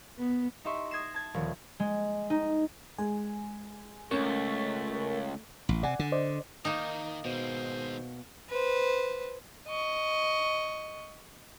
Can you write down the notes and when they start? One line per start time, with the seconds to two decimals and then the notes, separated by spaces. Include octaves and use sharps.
0.18 B3
0.64 D#4 G4 D#5 E5 C6 C#6
0.91 D#6 G#6 A#6 C7 E7
1.14 A5 G#6
1.34 D#1 D2 F3
1.80 G#3
2.30 D#4
2.98 G#3 G#5
4.11 C#2 A3 C#4 A#4 C#6
5.69 A1
5.83 C3 D5 F#5 G#5
5.99 D3
6.12 C5 D5 D#5
6.65 D#3 A#3 D#4
7.25 B2 D#3 G#3 C5
8.49 B4 C5
9.68 D#5 C#6